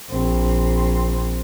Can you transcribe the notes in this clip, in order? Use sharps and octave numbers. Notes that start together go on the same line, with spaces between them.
A#1 C4